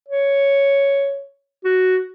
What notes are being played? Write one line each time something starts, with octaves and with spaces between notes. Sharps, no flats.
C#5
F#4